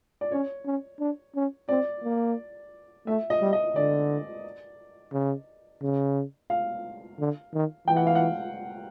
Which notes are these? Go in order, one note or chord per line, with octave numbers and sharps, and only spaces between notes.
D5
C#4 C#5
C#4
D4
C#4
C4 D5
A#3
A3 E5
D#5
G3
D#5
D3 D5
C#3
C#3
F5
D3
D#3
E3 G5
F#5
F5
F#5